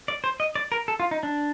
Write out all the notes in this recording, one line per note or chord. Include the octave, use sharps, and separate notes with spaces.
D5
C5
D#5
D5
A#4
A4
F4
D#4
D4